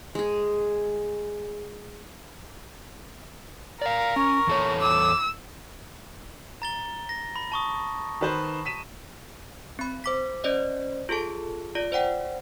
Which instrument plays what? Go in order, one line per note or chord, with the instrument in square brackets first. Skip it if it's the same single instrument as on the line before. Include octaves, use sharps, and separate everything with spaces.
[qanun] G#3 G#4
[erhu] A#4 [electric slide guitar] D5 F5
[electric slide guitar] C#4 [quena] C#6
[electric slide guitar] E2 A4 C#5
[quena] D6 [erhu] E6
[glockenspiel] A#5 A6 G7
A#6
B5
A5 C#6 D#6
[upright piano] D#3 B4 C5
B6 D#7 E7
[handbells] C4 B5
C5 D6 B6
C#4 C5 D5 D#5
F4 G#4 A4 A5
F4 D5
C5 D5 F#5 G5